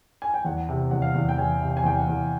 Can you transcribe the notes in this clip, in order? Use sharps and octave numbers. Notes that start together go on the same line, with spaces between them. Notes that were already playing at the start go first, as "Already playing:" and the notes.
G#5
G5
E2 F#5
C3
E2 F#5
F5
E2 F#5
G5
E2 G#5
C3
G5
G#5
E2 G5
F#5
E2